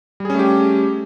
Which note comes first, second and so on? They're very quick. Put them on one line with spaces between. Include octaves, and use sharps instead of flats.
G3 G#4 C#4 A3 G4